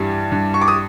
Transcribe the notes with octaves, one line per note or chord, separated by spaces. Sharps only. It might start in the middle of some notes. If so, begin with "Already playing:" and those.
Already playing: G2 E3 G3
G2
C#6
D6
D#6